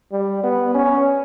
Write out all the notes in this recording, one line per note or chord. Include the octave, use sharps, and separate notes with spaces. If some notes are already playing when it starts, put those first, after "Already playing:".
G3
B3
C#4